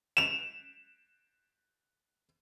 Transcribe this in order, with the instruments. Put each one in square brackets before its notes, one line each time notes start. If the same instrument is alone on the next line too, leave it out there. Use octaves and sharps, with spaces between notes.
[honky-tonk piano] E7 F7